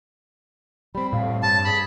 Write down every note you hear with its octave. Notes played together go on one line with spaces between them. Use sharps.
G3 C4 B5
A2 F5
G2 C#5 A5
G#4 B5